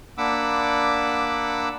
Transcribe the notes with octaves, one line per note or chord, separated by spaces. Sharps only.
A#3 D4 F#5 B5 D6 E6